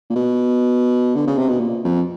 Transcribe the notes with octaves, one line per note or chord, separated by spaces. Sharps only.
A#2
B2
D3
C#3
C3
B2
A#2
F2